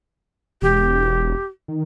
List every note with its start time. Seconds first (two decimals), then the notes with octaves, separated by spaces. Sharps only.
0.62 E1 G4
1.68 D#3